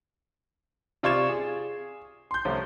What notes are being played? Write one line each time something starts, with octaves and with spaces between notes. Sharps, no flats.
C3 F4 D5 C#6 G#6 E7
G#4
C6 G6
C2 F3 A3 C#4